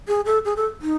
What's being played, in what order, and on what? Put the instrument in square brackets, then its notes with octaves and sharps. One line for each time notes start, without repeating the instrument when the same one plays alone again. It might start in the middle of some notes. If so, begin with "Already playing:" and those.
[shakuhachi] G#4
A4
G#4
A4
D#4